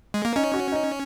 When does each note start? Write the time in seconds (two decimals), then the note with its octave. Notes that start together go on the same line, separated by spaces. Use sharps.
0.14 G#3
0.25 A#3
0.36 C#4 D#4
0.54 F#4
0.72 D#4